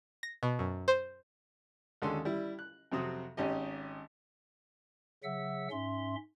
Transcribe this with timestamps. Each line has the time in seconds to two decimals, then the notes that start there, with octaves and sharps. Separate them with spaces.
0.23 A#6
0.43 B2
0.59 F#2
0.88 C5
2.02 D#2 D3 G#3 C#4 A4 C6
2.25 G3 E4
2.59 F#6
2.92 F2 C3 F#3 C4 F#4 D#6
3.37 G#1 C#4 D#4 G4 D#5
5.24 C#3 F#3 E5 F#5 E6
5.71 G#2 C#4 E5 C6